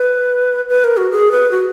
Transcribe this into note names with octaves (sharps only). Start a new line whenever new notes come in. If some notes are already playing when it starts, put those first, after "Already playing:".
Already playing: B4
B4
A#4
F#4
G#4
B4
F#4